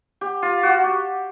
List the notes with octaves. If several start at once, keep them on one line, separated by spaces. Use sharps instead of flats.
G4
F4
F#4
G4